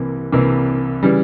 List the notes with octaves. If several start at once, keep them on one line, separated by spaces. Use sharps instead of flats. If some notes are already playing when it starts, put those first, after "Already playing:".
Already playing: C2 C3 E3 A#3
C2 C3 E3 A#3
C#3 E3 G3